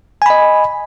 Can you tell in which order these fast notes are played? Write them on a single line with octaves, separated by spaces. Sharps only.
G#5 B5 D#5